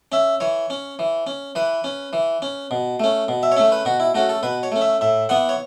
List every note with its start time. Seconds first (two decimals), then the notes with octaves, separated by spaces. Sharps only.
0.12 C#4 E5
0.40 E3 C#5
0.70 C#4
0.99 E3
1.27 C#4
1.55 E3 B4
1.84 C#4
2.13 E3
2.42 C#4
2.71 B2
3.00 A3 C#4
3.28 B2
3.43 E5
3.52 C#5
3.57 A3 C#4 E5
3.72 B4
3.85 B2 F#4
4.00 E4
4.14 A3 C#4 F#4
4.29 A4
4.43 B2 B4
4.63 C#5
4.72 A3 C#4
4.81 E5
5.01 A2 E5
5.29 E3 B3 F#5
5.49 C#5